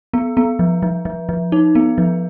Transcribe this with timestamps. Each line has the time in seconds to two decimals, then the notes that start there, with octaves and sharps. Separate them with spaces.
0.14 B3
0.37 B3
0.59 F3
0.83 F3
1.05 F3
1.29 F3
1.52 D#4
1.75 B3
1.98 F3